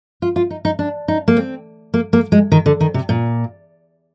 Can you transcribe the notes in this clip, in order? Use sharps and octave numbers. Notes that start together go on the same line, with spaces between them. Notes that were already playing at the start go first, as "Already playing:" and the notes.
F4
F4
D#4
D#4
D4
D#4
A#3
C4
A#3
A#3
G#3
D#3
D3
D#3
C3
A#2